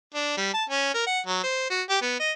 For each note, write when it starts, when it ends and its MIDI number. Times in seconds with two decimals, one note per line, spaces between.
0.14 0.34 62
0.37 0.49 55
0.54 0.64 81
0.70 0.91 61
0.94 1.02 70
1.06 1.20 78
1.27 1.41 54
1.43 1.69 72
1.70 1.82 66
1.89 1.97 67
2.02 2.18 59
2.20 2.32 75